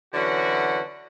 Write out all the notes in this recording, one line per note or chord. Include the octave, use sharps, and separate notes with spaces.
D3 E3 F#3 C#4 F#4